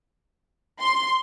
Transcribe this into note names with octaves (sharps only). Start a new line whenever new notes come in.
C6